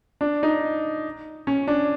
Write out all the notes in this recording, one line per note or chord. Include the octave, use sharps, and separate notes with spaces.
D4
D#4
C#4
D4